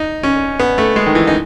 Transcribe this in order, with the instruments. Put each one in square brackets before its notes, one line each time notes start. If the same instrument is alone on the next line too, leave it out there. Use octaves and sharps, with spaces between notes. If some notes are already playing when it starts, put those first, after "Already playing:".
Already playing: [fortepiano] D#4
C#4
B3
A3
G#3
D#3
E3
D#4